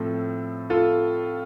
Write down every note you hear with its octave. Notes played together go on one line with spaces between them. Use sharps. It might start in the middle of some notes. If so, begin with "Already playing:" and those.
Already playing: A2 F3 A3 C4 A4
F4 A4